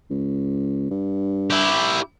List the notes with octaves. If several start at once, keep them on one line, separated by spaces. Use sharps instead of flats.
C#2
G2
E4 G4